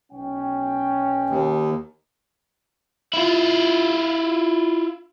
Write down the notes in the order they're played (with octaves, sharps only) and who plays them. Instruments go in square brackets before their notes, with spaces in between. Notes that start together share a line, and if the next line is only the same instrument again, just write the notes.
[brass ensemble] B1 C#4 G5
[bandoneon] D#2
[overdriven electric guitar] E4 F4